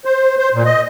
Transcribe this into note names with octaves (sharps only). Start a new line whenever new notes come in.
C5
C5
A#2
D#5